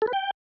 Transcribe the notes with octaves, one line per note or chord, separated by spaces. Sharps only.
A4
B4
G5